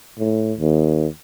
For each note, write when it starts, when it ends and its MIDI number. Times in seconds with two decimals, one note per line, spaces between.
0.19 0.53 45
0.58 1.07 39